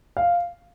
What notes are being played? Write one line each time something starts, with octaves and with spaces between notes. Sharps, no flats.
F5